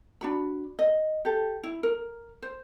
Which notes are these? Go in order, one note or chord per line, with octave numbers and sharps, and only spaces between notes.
D4 F#4 B5
D#5
G4 A4
E4
A#4
C5